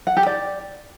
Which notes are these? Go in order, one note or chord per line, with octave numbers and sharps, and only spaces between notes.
F#5
G4
D5